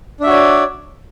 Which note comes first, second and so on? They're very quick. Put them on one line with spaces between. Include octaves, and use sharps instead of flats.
D4 E5 F#4 C#5 D5